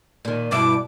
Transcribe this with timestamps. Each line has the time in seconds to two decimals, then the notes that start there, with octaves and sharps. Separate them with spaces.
0.25 A#2 D#3
0.51 G2 B2 E4 D6